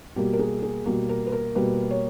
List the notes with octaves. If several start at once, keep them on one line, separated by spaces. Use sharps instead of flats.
B2 G3 A#3 G4
A#4
G#4
G#4
B2 G3 A#3
A#4
B4
A#4
B2 G3 A#3 B4
C#5